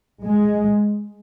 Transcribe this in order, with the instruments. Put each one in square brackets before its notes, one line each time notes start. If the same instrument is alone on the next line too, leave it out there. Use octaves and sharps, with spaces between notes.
[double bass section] G#3